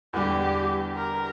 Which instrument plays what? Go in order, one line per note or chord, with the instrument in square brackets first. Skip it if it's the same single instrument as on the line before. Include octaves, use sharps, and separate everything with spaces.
[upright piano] E2 D3 G3 [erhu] G4
[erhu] A#4